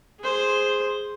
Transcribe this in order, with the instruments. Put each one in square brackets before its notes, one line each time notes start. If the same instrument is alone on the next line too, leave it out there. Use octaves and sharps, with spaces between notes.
[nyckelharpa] G#4 C5